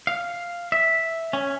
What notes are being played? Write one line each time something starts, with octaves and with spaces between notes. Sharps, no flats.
F5
E5
C#4